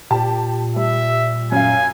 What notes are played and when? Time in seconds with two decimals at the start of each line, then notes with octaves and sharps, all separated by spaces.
0.11 A#2 G4 A5
0.76 G3 E5
1.52 F#2 F5 G#5